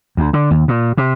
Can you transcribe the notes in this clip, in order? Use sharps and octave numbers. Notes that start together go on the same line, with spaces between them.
D2
D3
D#2
A#2
C3